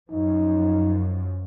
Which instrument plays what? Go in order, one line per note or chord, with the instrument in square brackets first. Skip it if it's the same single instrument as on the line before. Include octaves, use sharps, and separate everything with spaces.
[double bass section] F#2 F3 [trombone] D#4